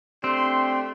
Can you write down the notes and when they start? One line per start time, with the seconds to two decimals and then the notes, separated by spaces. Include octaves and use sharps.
0.24 A3 C4 D4 G4 C6